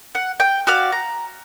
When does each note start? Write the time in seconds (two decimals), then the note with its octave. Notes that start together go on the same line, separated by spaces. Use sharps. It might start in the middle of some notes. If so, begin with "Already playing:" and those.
0.15 F#5
0.40 G5
0.67 F#4 G4 D5 F5
0.92 A#5